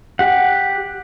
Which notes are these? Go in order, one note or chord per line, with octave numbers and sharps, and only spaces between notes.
G4 F#5